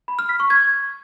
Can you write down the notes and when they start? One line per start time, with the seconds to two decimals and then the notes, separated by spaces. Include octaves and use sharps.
0.08 B5
0.19 F6
0.29 B6
0.40 C#6
0.50 G#6